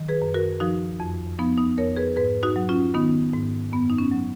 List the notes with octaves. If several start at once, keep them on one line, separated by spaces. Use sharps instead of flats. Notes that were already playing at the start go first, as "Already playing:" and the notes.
Already playing: D#3 F#3
G#4 B4
F#2
F#4 A#4
F3 D#4 F#4
F2
F3 B3 D#4
B3 D#4
F2 A#4 C#5
G#4 B4
G#2 G#4 B4
D#4 F#4
F#3
C#4 F4
D#3 B3 D#4
G#2
F#2 B3
D#4
C#4
F#3